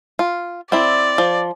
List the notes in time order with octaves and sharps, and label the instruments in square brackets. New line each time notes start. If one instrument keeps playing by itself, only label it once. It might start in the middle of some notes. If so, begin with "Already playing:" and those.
[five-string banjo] F4
[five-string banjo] C4 E4 [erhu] D5
[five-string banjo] F3